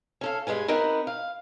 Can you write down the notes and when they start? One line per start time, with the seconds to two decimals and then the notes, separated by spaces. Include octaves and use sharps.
0.21 C#4 A4 F5
0.47 G2 C3 G#3 B4 G#5
0.68 B3 C4 D#4 F#4 A#4 B4
1.07 F5